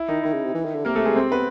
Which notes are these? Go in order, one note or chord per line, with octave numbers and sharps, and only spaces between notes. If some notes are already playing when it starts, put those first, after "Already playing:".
Already playing: E4
D#3 D#4
D#3 E4
C#3
C3
E3
D#3
D3
C3 A#3 A#4
A3 A4
G#3 G#4
C4 C5
B3 B4